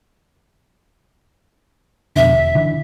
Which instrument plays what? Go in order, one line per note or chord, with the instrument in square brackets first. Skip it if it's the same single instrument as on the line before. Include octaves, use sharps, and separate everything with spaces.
[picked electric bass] F2 B2 D3 [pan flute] E5
[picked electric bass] E1
D3 E3